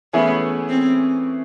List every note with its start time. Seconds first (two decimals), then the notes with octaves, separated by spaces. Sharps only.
0.13 E3 A3 B3 C#4 E4 G#4
0.69 C4